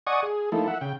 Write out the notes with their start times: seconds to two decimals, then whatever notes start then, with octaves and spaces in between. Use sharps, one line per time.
0.07 D5 D#5 F#5 G#5 C#6 D#6
0.23 G#4
0.52 F3 A3 A#3 D#4 E4 A4
0.68 E5 F#5
0.81 C#3 G5